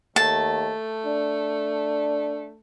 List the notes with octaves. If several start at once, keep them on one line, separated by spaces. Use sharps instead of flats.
D#2 A3 A5
D4